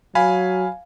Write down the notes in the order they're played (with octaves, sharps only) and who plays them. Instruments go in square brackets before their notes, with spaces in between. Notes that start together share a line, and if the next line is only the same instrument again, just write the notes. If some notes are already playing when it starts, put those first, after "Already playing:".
[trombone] F#3 [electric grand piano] F5 G#5 B5